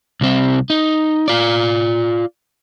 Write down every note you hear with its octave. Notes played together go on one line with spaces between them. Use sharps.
C2 C4
D#4
F4 D5